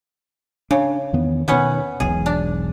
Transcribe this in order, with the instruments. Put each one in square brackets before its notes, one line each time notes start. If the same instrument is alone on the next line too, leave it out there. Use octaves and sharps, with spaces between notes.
[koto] C#3 [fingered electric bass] D4
[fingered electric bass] E2 D#3 B3
[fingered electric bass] B2 D#3 [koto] B3 C#4 F#5
[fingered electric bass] E1 B1 B2 [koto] G#4
[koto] D4